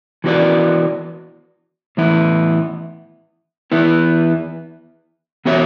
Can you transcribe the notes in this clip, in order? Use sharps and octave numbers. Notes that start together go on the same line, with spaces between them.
E3 B3 F#4 B4 D5
A2 E3 B3 E4
E3 B3 E4 B4
E3 B3 F#4 C#5 E5